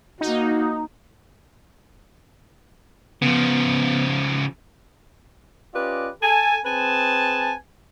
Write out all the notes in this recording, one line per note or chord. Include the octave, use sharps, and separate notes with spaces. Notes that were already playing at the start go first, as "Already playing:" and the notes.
A#3 D#4 F#4
C#3 F3 B3
C#4 F4 G4 B4 D5 D#5
A4 G#5 A5
C4 G#4 B4 G#5 A5